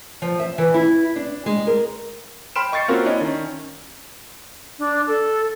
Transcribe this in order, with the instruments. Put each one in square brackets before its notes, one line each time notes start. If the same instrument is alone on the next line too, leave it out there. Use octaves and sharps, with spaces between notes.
[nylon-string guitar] F3
E5
E3
E4
D4
G#3
A#4
[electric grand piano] G5 B5 C6 F6 D7 E7
D#5 C#6 G6 A6 C7 C#7
A#3 C4 C#4 F4 F#4 A#4
D4 E4 C#5 D#5
D#3 C#4
[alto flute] D4
A4